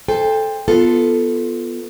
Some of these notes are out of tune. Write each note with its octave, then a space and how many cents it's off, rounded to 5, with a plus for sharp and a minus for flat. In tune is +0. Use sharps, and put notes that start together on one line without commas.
A4 -10 C5 +0 G5 +35
B3 +0 F4 +0 A4 +0